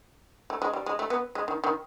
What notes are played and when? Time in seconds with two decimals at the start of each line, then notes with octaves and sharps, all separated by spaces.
0.50 A3
0.62 G#3
0.73 G3
0.86 G#3
0.99 A3
1.10 B3
1.35 G#3
1.48 D#3
1.64 D#3